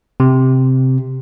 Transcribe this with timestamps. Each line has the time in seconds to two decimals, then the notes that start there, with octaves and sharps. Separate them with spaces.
0.20 C3